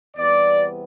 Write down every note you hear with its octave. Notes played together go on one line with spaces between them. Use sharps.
E2 C3 G3 B3 D5